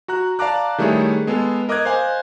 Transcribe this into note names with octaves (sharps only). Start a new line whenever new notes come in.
F#4 A#5 F#6
D5 F5 A5 A#5 D6 F#6
D#3 G3 A3 E4 G#4 C#5
G#3 B3 G#4 A4
A#4 D#5 D6 D#6 F#6 G#6
C5 D#5 F5 G#5